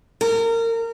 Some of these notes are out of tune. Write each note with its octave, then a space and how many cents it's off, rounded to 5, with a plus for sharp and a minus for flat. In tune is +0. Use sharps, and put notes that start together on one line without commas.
A#4 -25